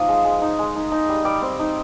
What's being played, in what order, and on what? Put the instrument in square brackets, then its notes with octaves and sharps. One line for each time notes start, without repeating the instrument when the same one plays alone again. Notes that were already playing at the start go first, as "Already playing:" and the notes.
Already playing: [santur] F3 A#3 D#4 D#6
G#3
G#3
D#4
G#3
D#4
D#4
G3
G3 D6
C4
D#4